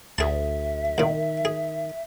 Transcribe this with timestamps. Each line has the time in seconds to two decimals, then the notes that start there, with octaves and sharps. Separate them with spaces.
0.18 D2 G#4 E5 A5
0.98 C2 A#2 D#3
1.45 G#4